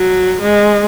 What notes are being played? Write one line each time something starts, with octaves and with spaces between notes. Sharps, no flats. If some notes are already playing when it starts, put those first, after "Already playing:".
Already playing: F#3
G#3